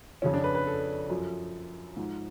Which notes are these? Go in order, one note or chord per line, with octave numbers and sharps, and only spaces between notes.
F2 C#3 F3 C#4
D4
B4
B4
A4
F#2 F3
G#2 F3